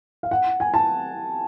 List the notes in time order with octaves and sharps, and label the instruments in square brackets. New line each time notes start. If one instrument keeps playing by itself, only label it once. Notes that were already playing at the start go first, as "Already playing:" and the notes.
[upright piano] F5
F#5
G#5
A5